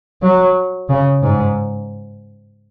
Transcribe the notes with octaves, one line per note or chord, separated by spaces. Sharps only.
F#3
C#3
G#2